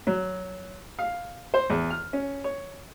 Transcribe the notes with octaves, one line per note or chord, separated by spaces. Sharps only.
F#3
F5
C5
E2
F6
C#4
C#5